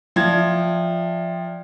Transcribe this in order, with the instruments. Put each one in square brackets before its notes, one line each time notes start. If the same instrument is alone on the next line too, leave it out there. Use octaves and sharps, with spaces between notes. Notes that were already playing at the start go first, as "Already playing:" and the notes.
[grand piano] F3 G#6 [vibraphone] D5 E5 G5